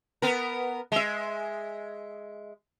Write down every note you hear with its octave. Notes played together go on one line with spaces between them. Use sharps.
B3 A#4
G#3 E5